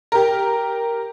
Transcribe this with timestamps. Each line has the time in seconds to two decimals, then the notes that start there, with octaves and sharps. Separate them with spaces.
0.12 G4 A#4